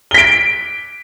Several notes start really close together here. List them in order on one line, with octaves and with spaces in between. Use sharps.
G7 B6 D7